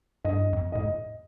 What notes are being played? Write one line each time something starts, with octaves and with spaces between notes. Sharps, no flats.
G2 D#5
F2
A2 D#5